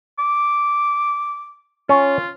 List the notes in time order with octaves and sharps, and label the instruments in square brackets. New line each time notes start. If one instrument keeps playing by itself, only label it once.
[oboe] D6
[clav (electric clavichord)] C#4 [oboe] F4